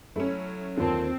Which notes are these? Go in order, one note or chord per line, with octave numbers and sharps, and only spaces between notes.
F#3 A3 C#4 E4
D#2 D3 A#3 C4 F4 A5